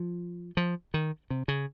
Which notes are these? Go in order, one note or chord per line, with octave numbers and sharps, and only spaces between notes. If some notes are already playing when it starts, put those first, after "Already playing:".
Already playing: F3
F3
D#3
C3
C#3